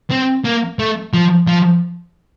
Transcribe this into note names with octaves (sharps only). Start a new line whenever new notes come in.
C4
A#3
A3
F3
F3